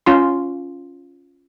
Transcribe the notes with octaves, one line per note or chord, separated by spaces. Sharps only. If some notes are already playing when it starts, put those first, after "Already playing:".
C#4 F4 C6